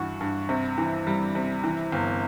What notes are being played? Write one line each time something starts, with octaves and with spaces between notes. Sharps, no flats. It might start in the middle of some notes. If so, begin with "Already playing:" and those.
Already playing: G2 E3 F#4
G2
C3
E3
G3
C3
E3
G1